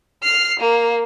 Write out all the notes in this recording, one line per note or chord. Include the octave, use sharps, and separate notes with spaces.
F6 C7
A#3